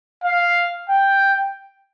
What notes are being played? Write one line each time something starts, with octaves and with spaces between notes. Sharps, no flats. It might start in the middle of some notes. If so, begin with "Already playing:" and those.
F5
G5